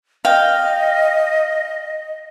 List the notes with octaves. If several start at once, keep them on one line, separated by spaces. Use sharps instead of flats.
D#5 F5 G5